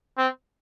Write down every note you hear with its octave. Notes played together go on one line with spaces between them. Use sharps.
C4